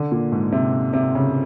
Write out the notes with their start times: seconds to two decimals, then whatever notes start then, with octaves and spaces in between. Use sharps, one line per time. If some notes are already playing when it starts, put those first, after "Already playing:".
Already playing: D3
0.12 A#2
0.32 G#2
0.52 C3
0.93 C3
1.15 C#3